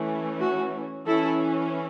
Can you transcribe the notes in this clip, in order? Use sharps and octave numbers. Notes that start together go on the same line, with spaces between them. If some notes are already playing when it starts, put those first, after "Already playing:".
Already playing: E3 A3 C#4
F#4
E3 C#4 E4 A4